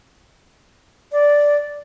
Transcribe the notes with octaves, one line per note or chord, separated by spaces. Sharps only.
D5